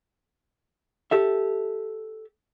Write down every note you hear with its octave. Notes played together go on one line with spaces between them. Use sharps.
G4 A4 E5